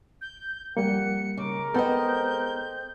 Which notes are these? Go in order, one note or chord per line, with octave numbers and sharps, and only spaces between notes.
G6
F2 G3 A#3 A#4 F#5 C#7
G#2 C#3 G#3 A#4 D6
B3 C4 A4 C5 D#5 G6